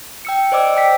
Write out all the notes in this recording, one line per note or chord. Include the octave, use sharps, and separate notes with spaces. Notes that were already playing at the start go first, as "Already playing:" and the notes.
G5 E6 C#7
C5 D5 D#5 D6 E6
G5 E6 B6